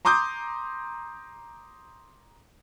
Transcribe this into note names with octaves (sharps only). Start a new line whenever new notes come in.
A#5 C6 D6 D#6 G6